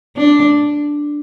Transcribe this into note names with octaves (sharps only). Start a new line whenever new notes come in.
D4